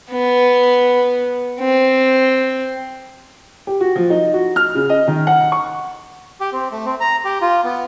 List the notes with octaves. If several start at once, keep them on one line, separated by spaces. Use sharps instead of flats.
B3
C4
G4
F#4
F3
D#4
F#4
F6
C#3
D#5
D#3
F#5
C#6
G4
C4
A3
C4
A#5
G4
F4
B3